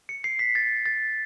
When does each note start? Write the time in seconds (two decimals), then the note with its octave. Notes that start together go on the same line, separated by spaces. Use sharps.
0.09 C#7
0.24 C7
0.39 B6
0.55 A6
0.86 A6